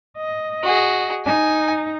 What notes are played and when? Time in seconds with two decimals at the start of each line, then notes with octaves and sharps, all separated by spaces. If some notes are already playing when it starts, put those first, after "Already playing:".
0.17 D#5
0.63 F#4 G#4
1.26 D#4 G#5